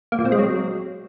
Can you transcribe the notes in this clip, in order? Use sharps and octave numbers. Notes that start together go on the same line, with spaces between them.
A#3
A#2
C4
G#3
F#3